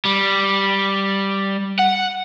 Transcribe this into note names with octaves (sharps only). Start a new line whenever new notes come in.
G3
F#5